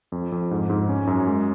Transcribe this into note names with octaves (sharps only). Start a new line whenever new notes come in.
F2
F2
G#2
G#2
C#4
F#2
G#3